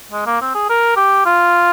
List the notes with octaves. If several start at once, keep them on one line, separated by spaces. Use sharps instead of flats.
G#3
A#3
C4
G#4
A#4
G4
F4